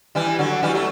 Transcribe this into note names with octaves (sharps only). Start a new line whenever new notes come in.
E3 G3
D3 F#3
E3 G3
F#3 A3